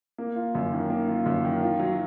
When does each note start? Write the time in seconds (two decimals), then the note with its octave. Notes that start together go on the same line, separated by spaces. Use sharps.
0.18 A#3
0.36 F4
0.55 F#2
0.72 D#3
0.90 A#3
1.08 F4
1.26 F#2
1.45 D#3
1.63 F4
1.80 F#3